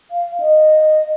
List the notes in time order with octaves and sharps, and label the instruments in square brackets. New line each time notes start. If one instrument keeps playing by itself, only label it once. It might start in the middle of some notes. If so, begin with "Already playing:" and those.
[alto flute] F5
D#5